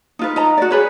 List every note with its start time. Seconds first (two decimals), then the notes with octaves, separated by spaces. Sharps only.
0.19 D#4 F4 B4
0.36 D#4 D#5 A#5
0.57 F#4 D5
0.71 G#4 B4 C#5